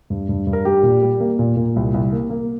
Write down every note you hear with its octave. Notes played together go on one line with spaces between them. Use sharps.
G2
G2
G2
A#4
G3 G4
A#2
G3
A#3
A#2
A#2
C2
C2
A#3
A#3